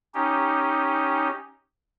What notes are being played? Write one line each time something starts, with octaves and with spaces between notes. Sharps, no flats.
C#4 D#4 G4